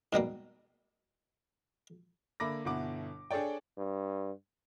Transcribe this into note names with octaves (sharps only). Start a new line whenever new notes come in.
G#2 B2 G3 A#3
D3 A#3 E5 B5 D6 A#6
G1 B2 E3 E4 F#5 D6
D4 G#4 A4 C#5 D5 G5
G2